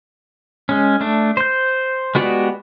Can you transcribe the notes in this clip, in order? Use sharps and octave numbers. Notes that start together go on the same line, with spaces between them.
G#3 C#4
A3 D4
C5 G6
G#3 B3 F#4 G4 D5